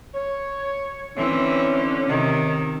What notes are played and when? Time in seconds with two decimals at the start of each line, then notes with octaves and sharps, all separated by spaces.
0.14 C#5
1.17 D3 E3 C4 C#4
2.08 C3 D#3